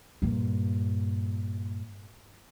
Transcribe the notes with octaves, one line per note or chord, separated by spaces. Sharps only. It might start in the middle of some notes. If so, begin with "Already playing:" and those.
G2 A#2